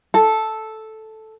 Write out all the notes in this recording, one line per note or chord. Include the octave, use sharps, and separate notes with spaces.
A4